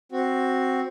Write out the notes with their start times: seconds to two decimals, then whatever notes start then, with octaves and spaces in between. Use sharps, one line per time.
0.12 C4 F#4